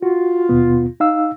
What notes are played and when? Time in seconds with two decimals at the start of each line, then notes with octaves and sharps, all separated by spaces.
0.03 F4 F#4
0.49 D#2 B2 B3
1.00 D#4 F5 E6